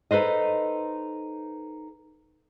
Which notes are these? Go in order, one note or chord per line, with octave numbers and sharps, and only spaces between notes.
D#4 A4 B4 C5 D#5